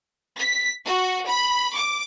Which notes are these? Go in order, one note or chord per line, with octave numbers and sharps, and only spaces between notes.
B6
F#4
B5
D6